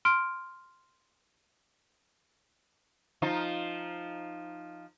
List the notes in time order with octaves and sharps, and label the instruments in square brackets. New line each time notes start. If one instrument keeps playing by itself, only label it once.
[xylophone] C6 F6 D7
[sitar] F3 D#4 F4